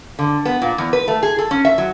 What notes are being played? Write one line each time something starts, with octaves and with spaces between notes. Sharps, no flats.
D3
B3
A#2
E2
B4
A3
G#4
A4
C#4
E5
F#3